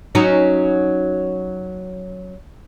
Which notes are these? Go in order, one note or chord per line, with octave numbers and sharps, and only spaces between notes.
F#3 C#4 D#4